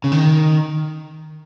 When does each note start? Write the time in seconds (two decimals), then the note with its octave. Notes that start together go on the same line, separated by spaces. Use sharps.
0.04 C#3
0.12 D#3